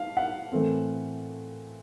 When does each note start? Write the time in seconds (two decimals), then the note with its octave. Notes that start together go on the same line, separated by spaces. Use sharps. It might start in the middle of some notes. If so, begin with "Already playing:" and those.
Already playing: F5
0.17 F#5
0.52 A2 E3 A3 C4